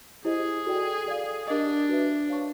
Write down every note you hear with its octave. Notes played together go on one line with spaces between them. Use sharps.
E4 G4 G#4 C5 D#5
F#4 A4 D5 G5
A4 D5 F5
D4 G4 A#4 D#5
F#4 B4 E5
C#5 F5 A5 C#6